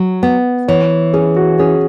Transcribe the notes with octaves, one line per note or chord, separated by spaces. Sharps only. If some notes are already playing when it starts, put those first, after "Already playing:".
Already playing: F#3
B3
E3 C#5
C#4 G#4
F#4
C#4 G#4